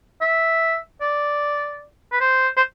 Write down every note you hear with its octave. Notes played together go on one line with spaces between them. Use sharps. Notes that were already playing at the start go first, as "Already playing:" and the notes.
E5
D5
B4
C5
C5